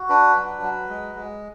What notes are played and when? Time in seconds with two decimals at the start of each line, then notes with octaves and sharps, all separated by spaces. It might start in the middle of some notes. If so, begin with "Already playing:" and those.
Already playing: F#4
0.09 D4 B4
0.35 F#3
0.62 F#3
0.89 G#3
1.15 G#3